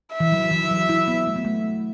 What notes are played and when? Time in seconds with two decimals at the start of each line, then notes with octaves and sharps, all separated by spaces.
0.14 E5
0.20 E3
0.32 F#3
0.51 E3
0.71 F#3
0.89 E4
1.08 B3
1.27 A3
1.36 B3
1.45 A3